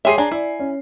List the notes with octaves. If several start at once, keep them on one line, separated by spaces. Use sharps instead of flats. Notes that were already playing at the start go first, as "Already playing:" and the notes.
G#3 G4 G#4 C#5 E5 C6 C7
D4 G#4 G#5 A#5
E4 D5
C#4